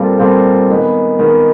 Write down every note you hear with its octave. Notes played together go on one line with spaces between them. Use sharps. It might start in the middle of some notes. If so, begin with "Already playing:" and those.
Already playing: A#2 G3 C4 F4 A4
A#2 G3 C4 F4 A4
D#3 G#3 B3
D#3 G#3 B3